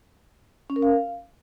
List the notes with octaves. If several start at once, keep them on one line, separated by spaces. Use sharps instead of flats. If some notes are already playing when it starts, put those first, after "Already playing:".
C#4
A#4
F5